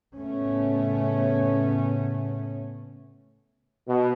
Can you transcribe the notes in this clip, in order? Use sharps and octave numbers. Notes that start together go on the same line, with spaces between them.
A2 C#3 A3 B3 C#4
B2